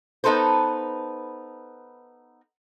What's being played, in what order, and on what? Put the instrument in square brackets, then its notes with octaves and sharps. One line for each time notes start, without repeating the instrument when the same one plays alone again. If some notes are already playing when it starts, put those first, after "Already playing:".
[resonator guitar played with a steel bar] B3 D#4 A4 B4 C5